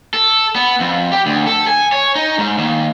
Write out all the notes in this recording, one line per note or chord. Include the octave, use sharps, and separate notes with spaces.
A4
B3
F2
G4
D2
A4
G#5
C#5
D#4
G#2
D#2